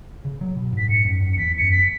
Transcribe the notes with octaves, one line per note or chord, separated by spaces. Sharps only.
C#3
F#3
B2
G#2 B6
G#2 C#7
F#2
F#2
C#7
E2 B6
F#2 C#7
B6